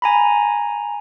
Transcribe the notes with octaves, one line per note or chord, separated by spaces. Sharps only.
G#5 A#5 B5